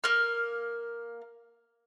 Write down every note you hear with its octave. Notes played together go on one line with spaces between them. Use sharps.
A#3 F6